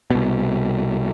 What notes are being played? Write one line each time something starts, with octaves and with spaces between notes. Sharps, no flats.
C2 B2